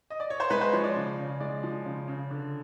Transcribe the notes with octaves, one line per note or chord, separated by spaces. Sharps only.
D#5
D5
C#5
C5
G#3 B4
C5
F3 C#5
D5
C#3
C#3
G#3 D5
F3
C#3
C#3
D3